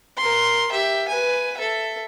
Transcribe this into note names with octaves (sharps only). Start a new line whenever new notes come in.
A#4 C6
G4 E5
B4 G#5
A4 E5